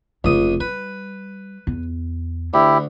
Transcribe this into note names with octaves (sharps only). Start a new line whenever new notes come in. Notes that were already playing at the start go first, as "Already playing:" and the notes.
F1 C#2 C#3 D#6
G3 B4
E2
D2 E4 G4